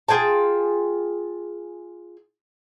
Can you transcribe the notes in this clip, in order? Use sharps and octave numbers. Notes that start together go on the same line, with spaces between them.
F4 G#4 G5 A5